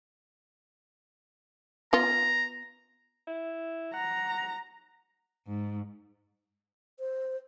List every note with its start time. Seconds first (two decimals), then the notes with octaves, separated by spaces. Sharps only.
1.93 B3 F4 A#5
3.27 E4
3.94 F#5 A#5
5.47 G#2
7.00 C5